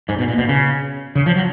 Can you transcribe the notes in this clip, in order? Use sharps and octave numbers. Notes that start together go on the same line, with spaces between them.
G#2
B2
A#2
B2
C#3
C#3
F3
F#3